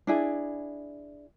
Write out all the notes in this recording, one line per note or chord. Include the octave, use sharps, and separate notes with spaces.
D4 E4 G#4